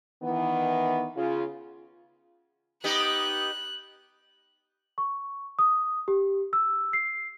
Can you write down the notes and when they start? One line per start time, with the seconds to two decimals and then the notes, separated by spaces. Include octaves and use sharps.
0.23 D#3 E3 B3
1.16 C#3 F4
2.84 B3 D#4 G4 F#6
4.98 C#6
5.59 D#6
6.08 G4
6.53 E6
6.93 C7